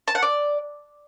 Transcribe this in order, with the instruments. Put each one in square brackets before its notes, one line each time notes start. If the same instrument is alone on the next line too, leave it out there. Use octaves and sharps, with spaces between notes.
[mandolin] A5
F#5
D5